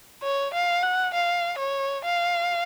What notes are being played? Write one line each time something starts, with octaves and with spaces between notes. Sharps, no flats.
C#5
F5
F#5
F5
C#5
F5